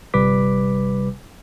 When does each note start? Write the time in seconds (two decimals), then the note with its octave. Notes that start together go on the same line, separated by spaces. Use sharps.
0.14 G1 C3 G3 B4 D6 B6